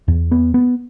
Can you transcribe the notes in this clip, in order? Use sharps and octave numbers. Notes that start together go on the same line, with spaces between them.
E2
B3
B3